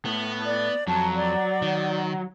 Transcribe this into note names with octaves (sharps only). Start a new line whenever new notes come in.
A2 B3
D5
F2 F#3 A5
D5
D#3